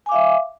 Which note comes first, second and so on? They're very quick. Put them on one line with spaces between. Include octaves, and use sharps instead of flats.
G#5 D6 F5 E5